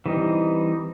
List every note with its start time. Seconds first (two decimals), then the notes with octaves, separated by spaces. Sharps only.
0.06 E3 G3 C4 D#4